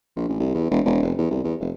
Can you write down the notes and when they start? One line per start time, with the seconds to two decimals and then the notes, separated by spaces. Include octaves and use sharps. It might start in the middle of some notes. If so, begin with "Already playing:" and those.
0.16 A#1
0.29 A1
0.40 C2
0.54 E2
0.71 E1
0.86 E1
1.03 F1
1.18 E2
1.31 C2
1.44 E2
1.60 F1